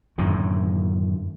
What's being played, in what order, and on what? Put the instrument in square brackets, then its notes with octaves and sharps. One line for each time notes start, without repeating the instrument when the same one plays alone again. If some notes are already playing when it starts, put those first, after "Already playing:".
[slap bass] F#2 A2 D3 D#3